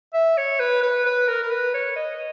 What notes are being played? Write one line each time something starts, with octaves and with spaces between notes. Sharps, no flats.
E5
C#5
B4
B4
B4
A#4
A#4
B4
C#5
D#5